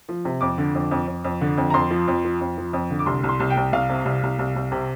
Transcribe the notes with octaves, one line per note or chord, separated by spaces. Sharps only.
F3
C3
F2 D6
D3
F2
F2
F2
F2
D3
F2
A#5
F2 C6
F3
F2
F3
F2
F3
F2
D3
D6
C2 C6
C2
C6
C2
G5
C2
C2 F5
C3
C2
C2
C2
C2
C3